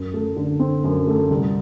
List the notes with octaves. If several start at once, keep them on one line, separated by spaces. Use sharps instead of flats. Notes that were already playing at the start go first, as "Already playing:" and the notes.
Already playing: F#2
A3
D3
C4
F#2
A3
C2